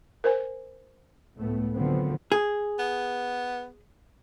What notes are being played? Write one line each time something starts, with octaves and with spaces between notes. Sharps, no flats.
A#4 C5 G#5
C#2 A2 A3 B3
D3 D#3 F3 F#3 B3 C4
G#4
B3